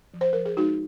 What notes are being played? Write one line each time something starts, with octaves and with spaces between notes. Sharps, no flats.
F3
C5
F3 A#4
G#4
G#3 D#4 F#4